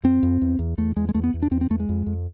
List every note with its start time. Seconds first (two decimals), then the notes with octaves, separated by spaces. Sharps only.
0.04 F2 C4
0.23 F2
0.42 E2
0.59 E2
0.78 E2 A3
0.96 E2 G#3
1.09 G#3
1.14 E2 A3
1.24 B3
1.34 E2
1.42 D4
1.51 E2 C4
1.61 C4
1.70 E2 A3
1.80 G#3
1.89 F2
2.06 F2